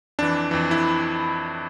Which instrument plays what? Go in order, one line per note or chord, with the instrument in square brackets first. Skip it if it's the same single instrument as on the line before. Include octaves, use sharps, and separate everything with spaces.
[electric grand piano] F2 E3 D4
F2 E3
E4